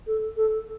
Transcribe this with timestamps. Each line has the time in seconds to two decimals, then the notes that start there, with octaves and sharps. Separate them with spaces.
0.07 A4
0.36 A4